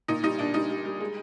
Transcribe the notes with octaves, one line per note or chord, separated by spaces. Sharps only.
A#2 D#4
G3 D#4
A#2 D4
G3 D#4
G3
G3
G#3